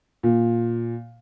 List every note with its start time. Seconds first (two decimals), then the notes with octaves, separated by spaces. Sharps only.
0.23 A#2